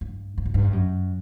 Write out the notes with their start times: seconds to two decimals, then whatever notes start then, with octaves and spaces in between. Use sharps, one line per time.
0.01 G2
0.38 G2
0.45 F#2
0.54 G2
0.73 F#2